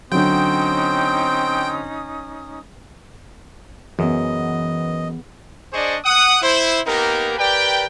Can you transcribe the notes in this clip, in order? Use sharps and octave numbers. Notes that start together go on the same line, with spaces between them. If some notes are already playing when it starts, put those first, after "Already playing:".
D3 F#3 C4 C#4 D#4 G5 D#6
F#2 E3 B3 G#4 D#5
D4 G#4 C5 D5 D#5 C#6
F#5 D#6
E4 C5
A#3 B3 D#4 G4 A#4
G4 A#4 B4 D5 G5